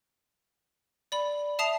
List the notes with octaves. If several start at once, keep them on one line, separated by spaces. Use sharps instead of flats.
D5 B5
E5 A5 D#6 C7 F7